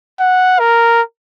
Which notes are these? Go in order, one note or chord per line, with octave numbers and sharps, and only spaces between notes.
F#5
A#4